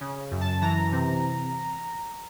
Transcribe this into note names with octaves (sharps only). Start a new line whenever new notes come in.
C#3
F#2
A5
E3 A#5
C3